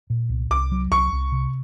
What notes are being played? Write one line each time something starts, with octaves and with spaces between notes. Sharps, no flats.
A#2
C2
C2 D6
F#3
C2 C#6
C2
C3